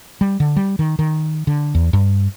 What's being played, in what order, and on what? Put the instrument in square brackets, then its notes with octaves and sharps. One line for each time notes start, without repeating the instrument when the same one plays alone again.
[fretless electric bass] G3
D3
G3
D#3
D#3
D3
E2
G2